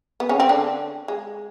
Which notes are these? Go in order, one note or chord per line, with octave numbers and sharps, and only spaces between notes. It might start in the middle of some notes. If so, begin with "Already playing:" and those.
B3
C#3 C#4
C4
D3 D4
G#3